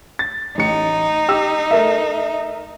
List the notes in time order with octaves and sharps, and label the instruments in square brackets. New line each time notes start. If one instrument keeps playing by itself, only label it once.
[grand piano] A6
[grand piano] A1 C#7 [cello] D#4
[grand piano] G4 E6
A3 A#4 E5